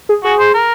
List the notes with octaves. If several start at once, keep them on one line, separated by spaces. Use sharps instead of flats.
G#4
F#4 G#4
C5
A#4